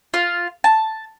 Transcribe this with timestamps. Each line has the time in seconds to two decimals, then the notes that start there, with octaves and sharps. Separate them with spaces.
0.14 F4
0.64 A5